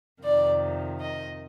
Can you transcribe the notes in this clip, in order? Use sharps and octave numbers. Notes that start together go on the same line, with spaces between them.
F2 C3 D#3 D5
D#5